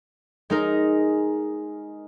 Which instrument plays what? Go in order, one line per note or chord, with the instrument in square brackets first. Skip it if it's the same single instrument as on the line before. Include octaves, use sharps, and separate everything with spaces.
[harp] G#3 D#4 A#4